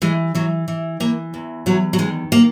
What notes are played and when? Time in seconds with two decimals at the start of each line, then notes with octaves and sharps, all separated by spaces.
0.02 E3 G#3
0.35 E3 F#3
0.68 E3
1.00 E3 A#3
1.34 E2
1.66 E2 F#3
1.93 F#3
1.98 D#3 G#3
2.32 A#3